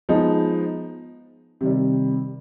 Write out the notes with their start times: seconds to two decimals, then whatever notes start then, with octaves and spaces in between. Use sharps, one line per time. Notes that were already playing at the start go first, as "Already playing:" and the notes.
0.09 F3 G#3 B3 D#4
1.61 C3 D#3 G3